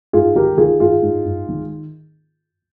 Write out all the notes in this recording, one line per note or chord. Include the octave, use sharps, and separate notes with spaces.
G#2 F4 G#4
D#3 G4 A#4
D#3 F4 G#4
G#2 F4 G#4
G#2
G#2
D#3